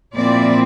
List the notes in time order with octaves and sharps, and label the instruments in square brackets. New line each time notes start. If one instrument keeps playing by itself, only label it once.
[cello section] A#2 F3 C4 E4 D5